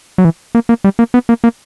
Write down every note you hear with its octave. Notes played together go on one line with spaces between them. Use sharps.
F#3
E3
A#3
A#3
G3
A#3
B3
A#3
A#3